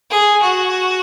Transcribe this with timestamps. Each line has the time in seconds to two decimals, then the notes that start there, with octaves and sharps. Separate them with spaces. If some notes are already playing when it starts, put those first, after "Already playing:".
0.10 G#4
0.42 F#4